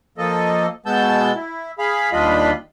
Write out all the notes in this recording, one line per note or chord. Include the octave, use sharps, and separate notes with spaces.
F3 A#3 A4 D#5
B2 G#3 B3 A5 E6 G6
E4
G#4 F5 B5
D#2 G3 D4 F4 D#5 B5